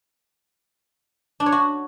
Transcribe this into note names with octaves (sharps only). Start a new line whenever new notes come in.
D4
C#5
F#4